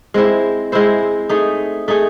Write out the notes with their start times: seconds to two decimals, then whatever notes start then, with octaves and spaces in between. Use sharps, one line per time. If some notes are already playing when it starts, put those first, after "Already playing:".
0.14 G#3 C4 E4 C5
0.72 G#3 C4 E4 C5
1.29 A3 D#4 G#4
1.88 A3 D#4 G#4